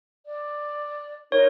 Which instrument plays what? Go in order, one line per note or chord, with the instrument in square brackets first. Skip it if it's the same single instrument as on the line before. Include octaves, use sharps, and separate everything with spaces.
[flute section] D5
[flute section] D#4 A#4 C5 [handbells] C#5